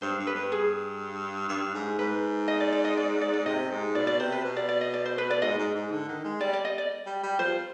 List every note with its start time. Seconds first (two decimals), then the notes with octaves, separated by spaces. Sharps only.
0.02 G2 C5
0.19 G2
0.27 B4
0.35 G2
0.52 G#4
1.49 G2
1.74 G#2
1.99 G#2 B4
2.48 D#5
2.60 D5
2.72 D5
2.84 D#5
2.97 D5
3.21 D5
3.33 D5
3.46 C3 D#5
3.71 G#2
3.95 B2 D5
4.07 D5
4.20 C3 C5
4.32 B4
4.44 B2
4.57 D5
4.69 D5
4.81 D#5
4.94 D5
5.06 C5
5.18 B4
5.30 D5
5.42 G#2 D#5
5.58 G#2
5.75 G#2
5.92 D3
6.08 D#3
6.24 G#3
6.41 G3 D5
6.53 D5
6.65 D#5
6.78 D5
7.06 G3
7.23 G3
7.39 F3 C5